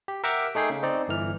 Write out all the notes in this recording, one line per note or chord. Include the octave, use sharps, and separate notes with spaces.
G4
A#4 E5 F#5 G5 A#5 D6
A3 D#4 G#4 G5 C7
C#3
C4 D#4 D5
G1 E3 F6